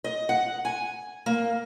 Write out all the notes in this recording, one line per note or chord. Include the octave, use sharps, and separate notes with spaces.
D#5
F#5
G#5
A#3